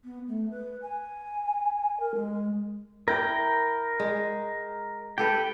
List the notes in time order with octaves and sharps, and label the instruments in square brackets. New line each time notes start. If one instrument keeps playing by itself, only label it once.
[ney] B3
A3
B4
G#5
A#4
G#3
[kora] E4 [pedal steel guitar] A#4 G5
[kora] G#3
[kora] G4 A4 B4 [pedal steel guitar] G5